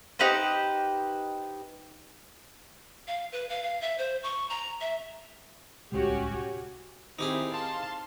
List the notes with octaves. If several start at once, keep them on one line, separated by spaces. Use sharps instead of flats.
D#4 G4 B4 C5
F5
B4
F5
F5
E5
C5
C#6
A#5
E5
D1 C2 G#3 C#4 F#4 G4
D#3 C4 D#4 E4 G4 G#4
F5 A5 C6